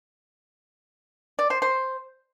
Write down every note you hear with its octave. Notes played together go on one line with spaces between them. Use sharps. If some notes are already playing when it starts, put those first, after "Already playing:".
D5
C5
C5